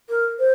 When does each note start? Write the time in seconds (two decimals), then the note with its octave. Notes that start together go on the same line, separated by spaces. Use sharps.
0.10 A#4
0.39 C5